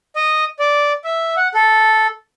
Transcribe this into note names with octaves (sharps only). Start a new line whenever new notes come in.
D#5
D5
E5
F#5
A4